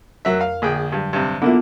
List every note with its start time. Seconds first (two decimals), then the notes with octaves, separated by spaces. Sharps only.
0.25 F2 F#3 A#4 E5 F#6
0.41 F5
0.62 A#1 D3 G#4 G5
0.92 G2 F#3
1.13 G2 C3
1.42 D3 A#3 B3 E4 F4